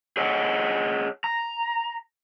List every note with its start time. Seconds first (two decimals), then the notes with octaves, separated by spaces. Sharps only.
0.17 G#4 C#5 D#5 F#5
1.24 A#5